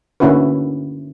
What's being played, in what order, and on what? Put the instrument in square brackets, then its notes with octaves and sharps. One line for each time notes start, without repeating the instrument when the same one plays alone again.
[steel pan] D3 A#3 C#4 E4 F#4 B4